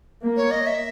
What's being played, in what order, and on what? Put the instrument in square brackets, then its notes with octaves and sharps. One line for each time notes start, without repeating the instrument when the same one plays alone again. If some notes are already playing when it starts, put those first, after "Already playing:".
[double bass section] A#3
[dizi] C#5
D#5
E5